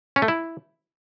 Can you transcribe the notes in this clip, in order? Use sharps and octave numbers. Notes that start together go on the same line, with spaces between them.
C#4
A3
E4